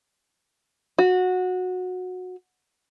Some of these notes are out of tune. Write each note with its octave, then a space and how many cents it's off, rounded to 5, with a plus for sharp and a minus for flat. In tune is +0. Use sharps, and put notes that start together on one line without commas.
F#4 -15